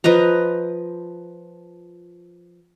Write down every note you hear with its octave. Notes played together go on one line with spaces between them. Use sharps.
F3 B4 D#5 A#5